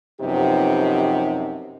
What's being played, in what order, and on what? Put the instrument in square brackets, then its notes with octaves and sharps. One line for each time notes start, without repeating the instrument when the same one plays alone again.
[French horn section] F#2 C3 F3 B3 D#4 G4